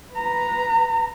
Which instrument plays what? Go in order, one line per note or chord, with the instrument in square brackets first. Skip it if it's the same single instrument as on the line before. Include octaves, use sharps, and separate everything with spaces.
[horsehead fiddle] B4 A#5